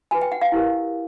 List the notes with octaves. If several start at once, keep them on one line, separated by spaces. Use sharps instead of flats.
F#4 B4 G#5
G5
F#5
F5
E4 G4 A#4